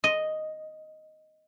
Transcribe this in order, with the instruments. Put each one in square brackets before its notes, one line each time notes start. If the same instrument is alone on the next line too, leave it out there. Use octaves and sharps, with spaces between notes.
[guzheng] D#5